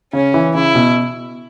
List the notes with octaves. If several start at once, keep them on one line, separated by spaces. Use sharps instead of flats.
C#3 C#4
E3
C#3 E4
B2